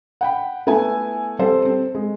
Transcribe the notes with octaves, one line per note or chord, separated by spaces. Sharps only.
F#5 G5 B5
A3 B3 E4 A4 G#5
G3 C4 A4 C5
C4 A4
G#3